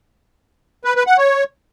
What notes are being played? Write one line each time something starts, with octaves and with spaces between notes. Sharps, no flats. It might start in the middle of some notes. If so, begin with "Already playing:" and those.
B4
B4
F#5
C#5